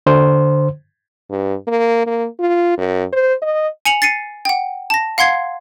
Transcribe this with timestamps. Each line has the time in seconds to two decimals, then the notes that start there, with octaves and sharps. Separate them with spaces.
0.06 D3 C5
1.31 G2
1.68 A#3
2.07 A#3
2.40 F4
2.78 F#2
3.13 C5
3.42 D#5
3.85 G#5 C#7 F7 F#7
4.02 A6 C7 C#7 D#7
4.45 F#5 G5
4.90 A5 A#6
5.18 F5 F#5 C6 G#6 C7